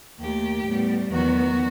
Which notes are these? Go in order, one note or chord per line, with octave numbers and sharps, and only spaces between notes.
D#2 D#3 A3 G4
A2 G3 B3
E2 D#3 F#3 B3 F#4